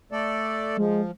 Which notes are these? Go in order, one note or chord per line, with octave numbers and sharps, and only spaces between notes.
A3 A4 D5
F3 G#3